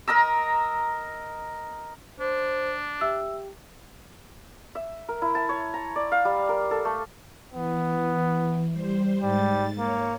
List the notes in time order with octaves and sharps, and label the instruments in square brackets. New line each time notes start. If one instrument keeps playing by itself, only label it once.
[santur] A#4 D#5 A#5 E6
[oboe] D4 [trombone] C5
[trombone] G4 [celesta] E5 E6
[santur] E5
A#4
E4
A5
C#5
A#5
D5
F5
G3
A#4
A4
A3
[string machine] E3 [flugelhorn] B3
[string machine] G3 C5
[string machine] G#2 A6 [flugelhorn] G3
[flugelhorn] A#3 [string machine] C#5